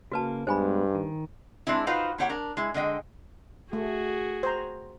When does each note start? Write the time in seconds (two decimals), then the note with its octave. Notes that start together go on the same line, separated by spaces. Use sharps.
0.12 C#3 A#3 F#4 B4 A5
0.47 G2 G#3 B3 C5 G#5 B5
0.95 D#3
1.67 G#3 C4 D4 E4
1.87 D#4 F4 F#4 B4 C5 F5
2.18 A#3 E4 G4 C#5 F#5
2.29 D4 A#4
2.57 G#3 E4
2.74 D3 G#3 D#5 G5
3.73 A3 F#4 G#4
4.43 C5 A#5